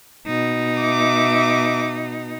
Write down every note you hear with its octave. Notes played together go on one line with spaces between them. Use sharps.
B2 D#4
E5 D6